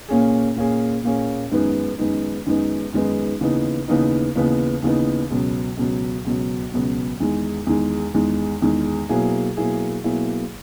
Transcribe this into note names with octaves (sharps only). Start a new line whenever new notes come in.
A#2 A#3 C#4 G#4
A#2 A#3 C#4 G#4
A#2 A#3 C#4 G#4
F#2 D#3 G#3 B3 D#4
F#2 D#3 G#3 B3 D#4
F#2 D#3 G#3 B3 D#4
F#2 D#3 G#3 B3 D#4
D#2 C#3 E3 B3 D#4
D#2 C#3 E3 B3 D#4
D#2 C#3 E3 B3 D#4
D#2 C#3 E3 B3 D#4
C#2 B2 F#3
C#2 B2 F#3
C#2 B2 F#3
C#2 B2 F#3
E2 D#3 G#3
E2 D#3 G#3
E2 D#3 G#3
E2 D#3 G#3
B2 F#3 A#3 E4 G#4
B2 F#3 A#3 E4 G#4
B2 F#3 A#3 E4 G#4